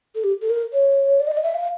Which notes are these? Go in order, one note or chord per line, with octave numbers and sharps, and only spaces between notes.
A4
G4
A4
A#4
C#5
D5
D#5
D5
D#5
E5
F5